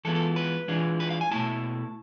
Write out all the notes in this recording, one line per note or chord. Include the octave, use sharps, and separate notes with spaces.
E3 G#3 B3 F4 A4
A4
B4
E3 G#3 D4 F4
B4
F5
G#5
B2 A3 E4 A5